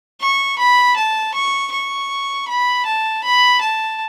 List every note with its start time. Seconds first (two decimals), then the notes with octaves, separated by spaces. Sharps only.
0.21 C#6
0.58 B5
0.96 A5
1.34 C#6
1.72 C#6
2.48 B5
2.86 A5
3.24 B5
3.61 A5